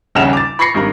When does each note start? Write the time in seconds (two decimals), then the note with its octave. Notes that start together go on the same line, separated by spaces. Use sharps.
0.15 D#1 A#1 C#3 F#5 E7 F7
0.33 D6 A6
0.59 B5 C#6 G#6 A#6 C7 C#7
0.74 G#1 G2 A#4